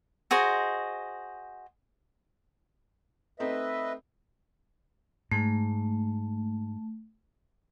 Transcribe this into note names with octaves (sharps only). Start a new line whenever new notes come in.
F#4 G#4 C5 D#5
A3 C4 D#4 B4 D#5 E5
G#2 A3